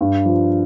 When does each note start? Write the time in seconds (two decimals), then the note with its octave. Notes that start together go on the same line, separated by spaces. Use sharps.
0.01 G2
0.25 F3